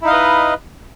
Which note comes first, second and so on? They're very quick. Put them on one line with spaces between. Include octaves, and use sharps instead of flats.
E4 D#4 F5 D#5 B4